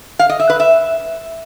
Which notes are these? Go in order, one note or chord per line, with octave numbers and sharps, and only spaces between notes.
F5
D#5
E5
B4
E5